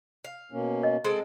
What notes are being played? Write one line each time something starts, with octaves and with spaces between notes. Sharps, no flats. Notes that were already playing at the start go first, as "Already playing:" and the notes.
F5
B2 A#3 C#4
D#5
G#3 C4 A4